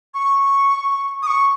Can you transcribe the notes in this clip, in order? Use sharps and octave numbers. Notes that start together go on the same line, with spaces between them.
C#6
D#6
C#6